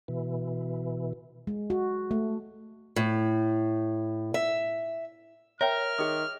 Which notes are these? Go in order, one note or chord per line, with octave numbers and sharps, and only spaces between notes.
B2 E3
G#3
F#4
A3
A2
E5
A#4 C#5 E5 G5 F6
D#3 G#4 D#6